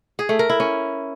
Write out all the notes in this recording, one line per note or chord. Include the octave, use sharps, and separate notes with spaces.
G#4
A3
A#4
E4
C#4